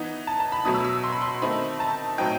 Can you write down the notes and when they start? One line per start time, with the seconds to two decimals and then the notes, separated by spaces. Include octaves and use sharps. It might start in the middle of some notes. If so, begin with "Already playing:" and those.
Already playing: E3 B3 D#4
0.27 A5
0.40 A5
0.52 B5
0.65 B2 F#3 A3 D#6
0.75 E6
0.85 E6
1.04 C6
1.12 B5
1.22 C6
1.42 D#3 A3 C4 D#4 B5
1.80 A5
2.18 A2 F#3 C4 D#4 G5